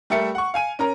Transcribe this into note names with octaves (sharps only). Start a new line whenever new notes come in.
G3 A3 A4 A#4 E5 C#7
F#5 C#6
F5 G#5 D#7
C#4 A#4 A#5